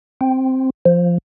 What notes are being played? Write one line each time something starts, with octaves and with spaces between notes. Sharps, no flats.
C4
F3